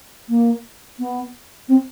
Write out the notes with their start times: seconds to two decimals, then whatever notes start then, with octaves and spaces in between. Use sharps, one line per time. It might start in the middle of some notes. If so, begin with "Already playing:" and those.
0.28 A#3
0.98 B3
1.68 C4